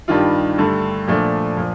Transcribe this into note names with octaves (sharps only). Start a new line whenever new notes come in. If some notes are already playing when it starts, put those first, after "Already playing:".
G2 D#3 G3 D4 F4
G2 D3 A3
A#2 F3 A3 D4
A#2 F3